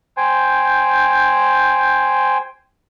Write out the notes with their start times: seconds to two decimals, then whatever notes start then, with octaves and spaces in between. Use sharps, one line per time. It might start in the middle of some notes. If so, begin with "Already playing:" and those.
0.17 C5 G5 G#5